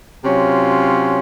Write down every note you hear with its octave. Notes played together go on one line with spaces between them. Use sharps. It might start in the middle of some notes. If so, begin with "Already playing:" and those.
C3 F#3 C#4 F4